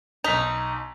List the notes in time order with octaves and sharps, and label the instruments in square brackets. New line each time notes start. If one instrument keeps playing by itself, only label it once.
[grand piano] B1 B6 F7 [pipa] D#4